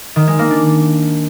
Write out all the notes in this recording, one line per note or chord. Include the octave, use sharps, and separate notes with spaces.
D#3
G#3
A#3
D4